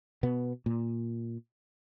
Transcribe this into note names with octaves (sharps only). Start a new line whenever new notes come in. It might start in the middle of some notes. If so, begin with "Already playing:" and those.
B2 B3
A#2